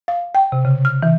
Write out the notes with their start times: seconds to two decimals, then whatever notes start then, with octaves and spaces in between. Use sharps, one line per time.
0.08 F5
0.35 G5
0.52 C3
0.65 C#3
0.85 F6
1.02 E3